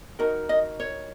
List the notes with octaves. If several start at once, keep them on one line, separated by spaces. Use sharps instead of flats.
D#4 F#4 A#4 D#5
D#5
C#5